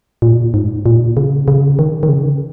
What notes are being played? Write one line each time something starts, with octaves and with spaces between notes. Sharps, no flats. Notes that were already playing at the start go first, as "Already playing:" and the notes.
A#2
G#2
A#2
C#3
C#3
D#3
D#3
C#3